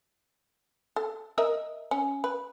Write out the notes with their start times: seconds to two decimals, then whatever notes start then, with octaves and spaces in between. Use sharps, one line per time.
0.96 A4
1.38 A#4 D#5 E5
1.91 C#4
2.24 B4